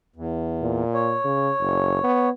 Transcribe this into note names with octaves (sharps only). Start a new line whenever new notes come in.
E2
A#2
C#5
C#3
F#1
B3